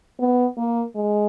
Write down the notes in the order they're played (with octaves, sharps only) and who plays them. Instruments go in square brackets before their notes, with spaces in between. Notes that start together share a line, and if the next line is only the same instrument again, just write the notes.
[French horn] B3
A#3
G#3